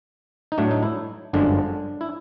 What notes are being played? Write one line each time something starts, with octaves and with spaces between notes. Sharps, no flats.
D#4
A2 F#3 A3 D4
D#4
E4
G1 F#2 D3 F3 G#3 D4
E4